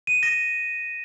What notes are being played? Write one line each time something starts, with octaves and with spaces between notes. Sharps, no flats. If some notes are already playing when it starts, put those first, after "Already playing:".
D#7
E7
A#6